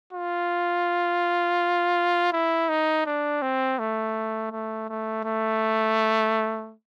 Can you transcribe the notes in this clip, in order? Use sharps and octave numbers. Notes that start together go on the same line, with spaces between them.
F4
E4
D#4
D4
C4
A3
A3
A3
A3